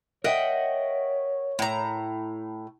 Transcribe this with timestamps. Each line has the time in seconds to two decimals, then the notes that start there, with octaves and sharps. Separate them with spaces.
0.24 A#4 C#5 D#5 E5 F#5 G5
1.59 A2 A#5